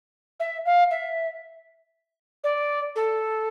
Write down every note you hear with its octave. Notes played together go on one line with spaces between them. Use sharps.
E5
F5
E5
D5
A4